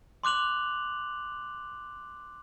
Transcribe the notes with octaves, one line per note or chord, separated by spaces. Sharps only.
C6 D6 F#6 F7 F#7